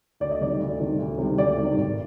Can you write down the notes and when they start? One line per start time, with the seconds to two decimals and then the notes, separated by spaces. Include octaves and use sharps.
0.20 D2 D5
0.31 D#5
0.40 C3 D#3 G3 D5
0.60 D2
0.80 C3 D#3 G3
0.99 D2
1.18 C3 D#3 G3
1.38 D2 D5
1.58 C3 D#3 G3
1.77 G#1